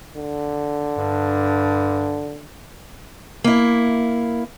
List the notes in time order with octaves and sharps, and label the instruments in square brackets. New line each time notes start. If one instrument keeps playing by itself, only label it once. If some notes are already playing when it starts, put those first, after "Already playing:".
[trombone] D3
[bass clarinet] G2
[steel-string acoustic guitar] A#3 E4